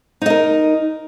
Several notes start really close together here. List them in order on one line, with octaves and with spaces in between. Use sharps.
D#4 D#5 A#4